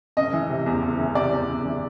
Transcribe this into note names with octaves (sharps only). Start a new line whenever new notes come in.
F#1 D#5
E3
C3
E2
F#1
E3
C3 D5
E2
F#1
E3